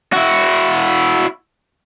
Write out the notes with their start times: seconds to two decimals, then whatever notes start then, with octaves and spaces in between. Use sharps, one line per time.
0.13 E4 F#4